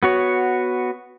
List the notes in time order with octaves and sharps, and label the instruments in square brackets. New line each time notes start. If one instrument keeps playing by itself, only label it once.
[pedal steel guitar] B3 F#4 C#5